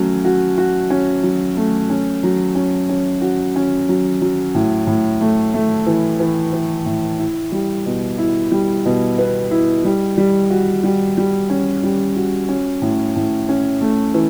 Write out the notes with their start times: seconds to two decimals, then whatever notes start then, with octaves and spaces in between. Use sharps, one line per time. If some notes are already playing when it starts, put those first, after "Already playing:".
Already playing: F#3 A3 C#4
0.25 F#4
0.58 F#4
0.90 C#4
1.23 F#3
1.57 A3
1.90 C#4
2.23 F#3
2.55 C#4
2.89 C#4
3.21 F#4
3.56 C#4
3.89 F#3
4.21 F#3
4.55 A2
4.87 A2
5.21 A3
5.54 A3
5.86 E3
6.20 E3
6.53 E3
6.86 A2
7.19 E4
7.52 G3
7.86 B2
8.18 E4
8.51 G3
8.85 B2
9.18 B3
9.51 E4
9.84 G3
10.17 G3
10.50 F#4
10.83 G3
11.17 G3
11.50 C#4
11.83 G3
12.16 F#4
12.49 C#4
12.82 A2
13.16 A2
13.49 C#4
13.81 A3
14.14 E3